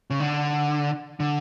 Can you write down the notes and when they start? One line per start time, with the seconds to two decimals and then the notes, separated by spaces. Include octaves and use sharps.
0.10 C#3
0.20 D3
1.20 D3